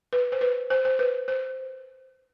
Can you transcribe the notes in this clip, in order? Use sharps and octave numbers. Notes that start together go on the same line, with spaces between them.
B4
C5
B4
C5
C5
B4
C5